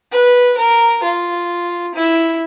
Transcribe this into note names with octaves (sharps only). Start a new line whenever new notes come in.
B4
A#4
F4
E4